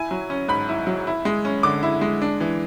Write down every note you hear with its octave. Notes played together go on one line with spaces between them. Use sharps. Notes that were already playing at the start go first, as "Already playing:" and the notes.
Already playing: E4 G#5
F#3
C#4
G#2 B5
E4
F#3
E4
G#3
C#4
D3 D6
E4
G#3
D4
E3